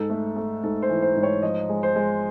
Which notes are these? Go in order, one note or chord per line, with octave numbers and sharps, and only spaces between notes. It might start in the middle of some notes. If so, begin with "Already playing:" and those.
Already playing: G#2 A4
A3
A3
G#2 A4
C5
E3
C5
G#2
C#5
F3 D#5
G#3
C5
G#3